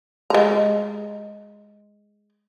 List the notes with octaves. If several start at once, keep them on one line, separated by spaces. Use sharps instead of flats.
G#3 A#5